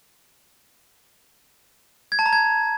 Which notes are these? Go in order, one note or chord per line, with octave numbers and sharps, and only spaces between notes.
G#6
A5
A#5
G#6